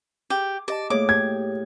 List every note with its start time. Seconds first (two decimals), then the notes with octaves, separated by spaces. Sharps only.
0.30 G4 G#4
0.68 G4 D5 D#5 A5
0.90 A2 A3 A#3 G#4 C#5 D6
1.09 G4 G#6